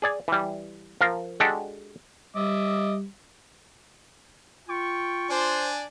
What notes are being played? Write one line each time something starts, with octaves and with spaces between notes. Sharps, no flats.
G#4 D5 G#5
E3 G3
F3 A#4 F5
G#3 D4 F#4 G4 A4
G3 D#5 E5 D6
F4 G5 C#6
D4 C5 D5 G#5